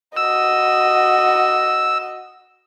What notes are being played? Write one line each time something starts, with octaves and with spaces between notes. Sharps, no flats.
F#4 D#5 E6